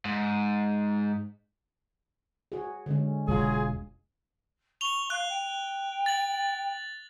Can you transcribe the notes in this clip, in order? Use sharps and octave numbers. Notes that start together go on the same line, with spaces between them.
G#2
F#4 G#4
D3 G#3 C#4
E1 F#3 F4 G#4
C#6 F7 G7
F5 F#6
G5
A6 F#7